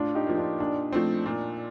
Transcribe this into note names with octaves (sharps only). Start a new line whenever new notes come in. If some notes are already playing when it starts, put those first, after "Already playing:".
Already playing: A2 D4 F4
D#4 G4
F3 A#3
D4 F4
A#2 D4
F3 A3 C4
A#2